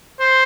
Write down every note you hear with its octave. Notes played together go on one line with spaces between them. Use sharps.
C5